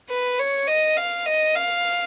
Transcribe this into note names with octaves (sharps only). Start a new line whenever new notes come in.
B4
C#5
D#5
F5
D#5
F5